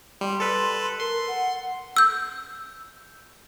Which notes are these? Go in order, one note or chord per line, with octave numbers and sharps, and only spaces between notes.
G3 C6
A4 B4
A#4 C6
F#5
E6 G6